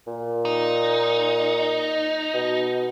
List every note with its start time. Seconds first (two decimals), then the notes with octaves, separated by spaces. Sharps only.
0.07 A#2
0.45 D#4
2.34 B2